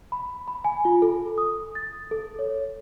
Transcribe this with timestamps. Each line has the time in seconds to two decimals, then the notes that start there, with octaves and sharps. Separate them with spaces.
0.12 B5
0.48 B5
0.65 G#5
0.85 F4
1.02 A4
1.38 D#6
1.75 A6
2.11 A4
2.39 C#5